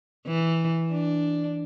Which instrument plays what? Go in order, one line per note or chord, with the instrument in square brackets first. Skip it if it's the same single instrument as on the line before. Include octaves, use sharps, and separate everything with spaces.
[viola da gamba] E3
D4